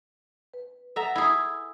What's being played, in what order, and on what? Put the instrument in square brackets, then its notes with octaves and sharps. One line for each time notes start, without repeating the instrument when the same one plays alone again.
[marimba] B4
[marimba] A4 F#5 [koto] E5 A#5
[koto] E4 G#4